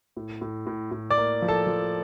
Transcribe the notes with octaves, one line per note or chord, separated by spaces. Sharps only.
A2
A2
A2
A2
D5 D6
A#3
F3
A4 A5
F3